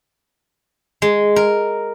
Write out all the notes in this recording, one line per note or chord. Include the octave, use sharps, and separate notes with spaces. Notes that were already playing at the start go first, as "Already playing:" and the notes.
G#3
A#4